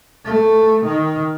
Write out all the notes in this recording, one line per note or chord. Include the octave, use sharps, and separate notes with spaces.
A3
D#3